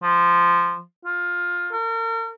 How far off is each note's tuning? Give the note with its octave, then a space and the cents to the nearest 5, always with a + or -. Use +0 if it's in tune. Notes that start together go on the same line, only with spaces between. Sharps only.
F3 -10
F4 +15
A#4 -40